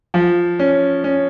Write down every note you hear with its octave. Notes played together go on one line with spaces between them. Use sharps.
F3
C#4
C#4